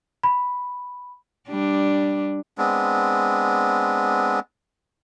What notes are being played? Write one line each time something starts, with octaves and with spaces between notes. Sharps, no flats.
B5
G3 D4
G#3 B3 C4 D4